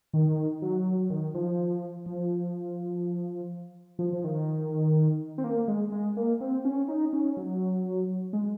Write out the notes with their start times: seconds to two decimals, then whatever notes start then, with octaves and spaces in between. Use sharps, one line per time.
0.13 D#3
0.62 F#3
1.10 D#3
1.34 F3
2.06 F3
3.99 F3
4.13 F3
4.24 D#3
5.38 C4
5.44 A#3
5.68 G#3
5.92 G#3
6.17 A#3
6.41 C4
6.65 C#4
6.88 D#4
7.13 C#4
7.37 F#3
8.33 G#3